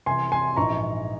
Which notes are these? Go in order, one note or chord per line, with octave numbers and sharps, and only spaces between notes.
C2 C3 E3 G#5 C6
G#5 C6
A#1 G#2 E3 A#5 C#6